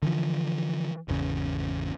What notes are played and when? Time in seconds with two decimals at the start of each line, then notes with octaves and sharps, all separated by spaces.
0.02 D3 E3 F3
1.08 G#1 E2 C#3